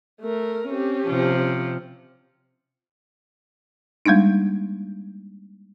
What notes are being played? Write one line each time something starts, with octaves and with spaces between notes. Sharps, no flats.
A3 A#4
C4 C#4 G4
C3 F3
G3 G#3 A#3 D4 D#4